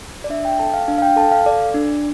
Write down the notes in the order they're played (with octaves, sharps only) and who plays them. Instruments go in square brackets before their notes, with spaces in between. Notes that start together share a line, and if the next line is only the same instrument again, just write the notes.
[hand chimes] D5
D4 E5
G5
A4 A5
F5
D4 F5
F5
G5
A4 A5
F5
A4 D5
D4